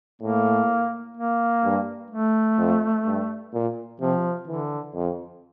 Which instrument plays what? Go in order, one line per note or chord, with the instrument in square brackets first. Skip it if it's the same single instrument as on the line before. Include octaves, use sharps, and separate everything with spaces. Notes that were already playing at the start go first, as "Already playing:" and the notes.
[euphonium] A2 [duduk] A#3
[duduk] A#3
[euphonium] G2
[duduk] A3
[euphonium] F2
G2
A#2
[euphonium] C3 [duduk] F3
[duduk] D3 [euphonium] E3
[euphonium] F2